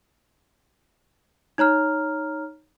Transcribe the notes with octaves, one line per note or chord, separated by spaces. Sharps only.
D#4 C#5 A#5 F6